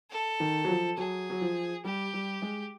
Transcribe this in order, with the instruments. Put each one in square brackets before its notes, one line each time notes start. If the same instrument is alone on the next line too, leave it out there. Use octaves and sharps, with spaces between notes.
[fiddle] A4
[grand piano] D#3
F#3
F3
[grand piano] F#3 [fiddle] G#4
[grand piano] F#3
F3
[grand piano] G3 [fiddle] G4
[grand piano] G3
G#3